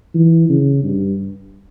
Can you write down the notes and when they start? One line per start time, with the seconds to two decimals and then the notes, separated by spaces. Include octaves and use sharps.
0.15 E3
0.49 C#3
0.83 G2